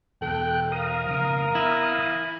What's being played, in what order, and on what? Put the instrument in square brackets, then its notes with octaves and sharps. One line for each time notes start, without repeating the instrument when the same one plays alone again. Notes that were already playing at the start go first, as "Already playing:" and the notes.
[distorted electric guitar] E2 B2 [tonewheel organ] A4 F#6 [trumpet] G5
[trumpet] A#4 [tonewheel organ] F5 A#5 D#6
[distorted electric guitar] F2 C#3
[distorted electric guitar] B3 [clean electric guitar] E4
[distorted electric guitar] E3